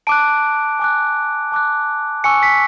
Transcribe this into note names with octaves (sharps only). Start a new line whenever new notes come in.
A5 D6 F#6 D7
G#5 D6 F#6
A5 D6 F#6
G#5 C#6 E6 C#7
B6